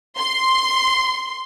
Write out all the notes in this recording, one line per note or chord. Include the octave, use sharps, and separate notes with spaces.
C6